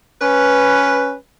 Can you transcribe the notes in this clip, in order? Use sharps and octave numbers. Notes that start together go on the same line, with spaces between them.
C#4 B4